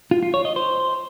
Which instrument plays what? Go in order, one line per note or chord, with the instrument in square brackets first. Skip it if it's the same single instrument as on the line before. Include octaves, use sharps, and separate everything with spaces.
[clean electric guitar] F4
F4
C#5
D#5
C5